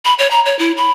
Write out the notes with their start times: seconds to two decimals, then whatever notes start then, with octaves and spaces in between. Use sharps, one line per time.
0.05 B5
0.19 C#5
0.31 A#5
0.46 C#5
0.59 E4
0.77 B5